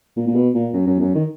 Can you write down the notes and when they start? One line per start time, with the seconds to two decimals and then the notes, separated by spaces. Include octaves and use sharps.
0.16 A#2
0.28 A#2
0.36 B2
0.55 A#2
0.74 F#2
0.87 F#2
0.97 E2
1.01 F#2
1.15 D#3